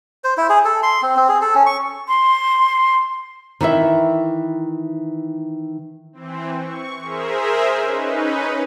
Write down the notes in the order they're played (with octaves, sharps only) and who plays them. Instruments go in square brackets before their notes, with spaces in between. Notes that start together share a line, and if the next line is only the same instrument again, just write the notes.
[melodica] C5
E4
G#4
A4
C6
C4
C4
G#4
A4
C#4
C#6
[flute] C6
[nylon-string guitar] D#3 E3 E4 E5
[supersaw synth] E3 C4
C#6
G#4 A#4 C5 E5
C#4 D#4 B4